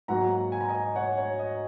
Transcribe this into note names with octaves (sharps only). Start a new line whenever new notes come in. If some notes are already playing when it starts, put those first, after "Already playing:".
G#2 F#3 A#3 F#5 A#5
G#5
A#5
D#5 G#5
C#5 F#5
C#5
D#5